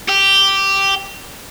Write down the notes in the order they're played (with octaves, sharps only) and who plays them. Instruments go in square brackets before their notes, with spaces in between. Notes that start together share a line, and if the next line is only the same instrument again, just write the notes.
[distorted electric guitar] G4